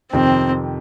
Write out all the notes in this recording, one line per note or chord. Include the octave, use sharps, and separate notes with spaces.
F2 C3 D#3 C4